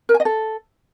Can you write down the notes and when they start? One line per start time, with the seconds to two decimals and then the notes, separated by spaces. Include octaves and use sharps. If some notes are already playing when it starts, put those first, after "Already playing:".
0.09 A#4
0.14 G#5
0.20 D#5
0.25 A4